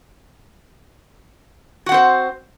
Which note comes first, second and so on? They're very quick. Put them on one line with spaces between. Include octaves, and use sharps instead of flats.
F#4 F#5 C4 C5